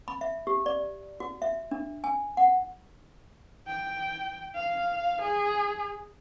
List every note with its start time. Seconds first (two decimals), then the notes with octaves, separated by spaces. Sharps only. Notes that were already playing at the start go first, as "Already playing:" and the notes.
0.08 B5
0.21 E5
0.47 G4
0.66 D5
1.20 F#4
1.42 E5
1.71 D4
2.04 G#5
2.37 F#5
3.67 G5
4.55 F5
5.22 G#4